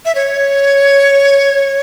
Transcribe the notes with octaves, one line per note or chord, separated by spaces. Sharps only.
E5
C#5